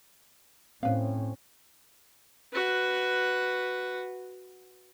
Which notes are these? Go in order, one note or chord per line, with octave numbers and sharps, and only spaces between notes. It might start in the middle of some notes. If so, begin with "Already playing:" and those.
A2 C4 C#4 B4 F5
F#4 B4